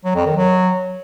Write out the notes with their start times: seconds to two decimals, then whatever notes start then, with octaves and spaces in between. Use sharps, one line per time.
0.05 F#3
0.15 F2
0.26 D#3
0.37 F#3